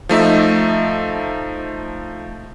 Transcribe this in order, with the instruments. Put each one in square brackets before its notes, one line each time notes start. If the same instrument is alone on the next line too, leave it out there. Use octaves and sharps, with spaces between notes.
[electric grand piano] F3 A3 D#4 E5